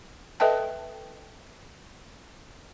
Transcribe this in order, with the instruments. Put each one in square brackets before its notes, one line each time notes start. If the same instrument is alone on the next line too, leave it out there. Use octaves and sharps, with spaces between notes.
[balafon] A4 B4 D#5 E5 G5 A5